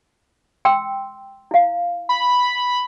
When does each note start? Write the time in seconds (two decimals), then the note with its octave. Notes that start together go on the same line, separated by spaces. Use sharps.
0.65 G5 C6 E6
1.51 E4 F5
2.09 B5